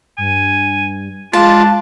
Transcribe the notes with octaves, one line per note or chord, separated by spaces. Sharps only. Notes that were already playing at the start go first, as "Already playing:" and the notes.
G2 G#5
G#3 D4 F4 A5